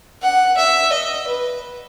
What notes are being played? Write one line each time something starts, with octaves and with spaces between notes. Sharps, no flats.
F#5
E5
D#5
B4